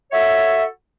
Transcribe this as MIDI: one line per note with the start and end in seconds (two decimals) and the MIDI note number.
0.12 0.64 66
0.12 0.64 69
0.12 0.64 73
0.12 0.64 76